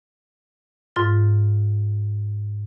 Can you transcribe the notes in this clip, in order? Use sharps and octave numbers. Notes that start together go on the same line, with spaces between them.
G#2 F4 A6